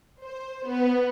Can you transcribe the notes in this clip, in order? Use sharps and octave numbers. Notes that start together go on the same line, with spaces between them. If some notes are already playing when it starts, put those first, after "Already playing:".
C5
B3